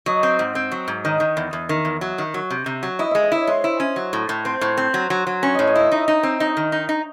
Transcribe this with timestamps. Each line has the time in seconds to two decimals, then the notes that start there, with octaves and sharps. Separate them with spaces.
0.06 F#3 D#5
0.23 C4
0.39 G#2
0.55 C4
0.72 F#3
0.88 G#2
1.04 D#3 D#5
1.20 D#3
1.37 E2
1.53 E2
1.69 D#3
1.85 E2
2.01 F#3
2.18 D#3
2.34 F#3
2.51 C3
2.66 C3
2.83 F#3
2.99 E4 D#5
3.11 G#3 E5
3.24 D#5
3.32 E4 C#5
3.47 G#3 C5
3.64 E4
3.80 C#4
3.96 F#3
4.13 A2
4.29 A2
4.45 C4 C5
4.61 A2
4.77 C4
4.94 F#3
5.10 F#3
5.27 F#3
5.43 C#4 C#5
5.55 A2 D#5
5.67 D#5
5.75 E4 E5
5.92 D#4 D#5
6.08 D#4
6.23 C4
6.40 D#4 D#5
6.57 D#3
6.72 D#4
6.89 D#4